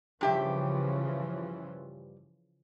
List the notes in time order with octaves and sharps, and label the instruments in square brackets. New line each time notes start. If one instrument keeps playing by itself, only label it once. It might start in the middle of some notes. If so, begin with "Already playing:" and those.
[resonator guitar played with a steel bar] G2 G4 E5 [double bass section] C#3 E3 F3